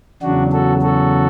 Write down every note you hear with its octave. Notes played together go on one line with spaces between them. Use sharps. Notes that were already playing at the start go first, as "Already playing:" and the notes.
E2 C#3 F#3 D4 F#4
F#4 A4
F#4 A4